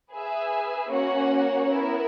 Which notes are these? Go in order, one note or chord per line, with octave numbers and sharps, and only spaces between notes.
G#4 B4 E5 G#5
A#3 C#4 F#4 C#5 F#5
B3 E4 A#4